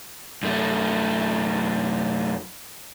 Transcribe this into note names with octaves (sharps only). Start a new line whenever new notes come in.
F#2 A3